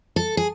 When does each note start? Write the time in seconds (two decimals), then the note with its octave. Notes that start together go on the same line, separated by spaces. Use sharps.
0.16 A4
0.37 G#4